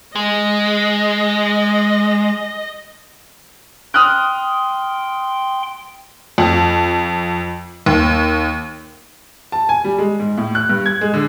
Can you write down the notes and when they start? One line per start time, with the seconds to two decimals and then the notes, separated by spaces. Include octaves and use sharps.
0.16 G#3 D#5
3.94 G5 C6 D#6 F6 F#6
6.38 F2
7.86 D#2
9.52 A5
9.69 G#5
9.84 G3
9.98 G#3
10.19 G#2
10.38 A2
10.55 F#6
10.69 G2
10.86 G#6
11.01 G#3
11.14 D3